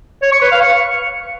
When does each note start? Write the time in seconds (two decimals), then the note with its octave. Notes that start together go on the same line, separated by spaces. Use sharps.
0.22 C#5
0.32 C#6
0.42 B4
0.51 F5
0.61 C#6